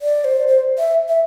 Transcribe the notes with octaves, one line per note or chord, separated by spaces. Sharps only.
D5
C5
C5
E5
E5